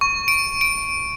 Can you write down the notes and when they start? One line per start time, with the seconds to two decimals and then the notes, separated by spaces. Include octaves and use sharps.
0.01 C#6
0.28 D7
0.61 D7